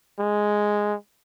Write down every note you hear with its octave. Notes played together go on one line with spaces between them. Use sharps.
G#3